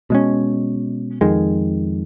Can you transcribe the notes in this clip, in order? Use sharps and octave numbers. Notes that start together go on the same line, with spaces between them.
B2 G#3 C#4
F2 D#3 G#3